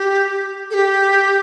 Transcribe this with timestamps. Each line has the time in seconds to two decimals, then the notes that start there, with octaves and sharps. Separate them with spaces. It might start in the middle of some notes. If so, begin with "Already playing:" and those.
Already playing: G4
0.71 A4
0.74 G4